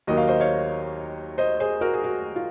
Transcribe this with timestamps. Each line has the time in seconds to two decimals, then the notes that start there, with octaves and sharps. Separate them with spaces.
0.07 D#2 D#3 F#3 A#3 D#5
0.17 F5
0.28 C5 D#5
0.40 C#5 F5
1.38 C5 D#5
1.60 G#4 C5
1.81 F#4 A#4
1.94 G#4
2.04 F#4
2.36 F4